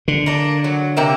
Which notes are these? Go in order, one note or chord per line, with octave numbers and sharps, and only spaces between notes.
D3
A#3 D4
F#3
C3 A#3 E5